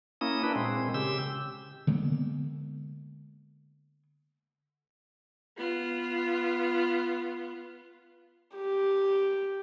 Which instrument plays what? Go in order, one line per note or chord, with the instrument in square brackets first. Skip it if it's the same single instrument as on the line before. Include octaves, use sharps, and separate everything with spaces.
[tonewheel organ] A#3 C#4 E4 D#6
D4 E4 B4
A#2 G#3 C4
C#3 G4 E6
[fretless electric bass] D3 G#3 A#3 B3
[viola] B3 F4
[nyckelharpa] G4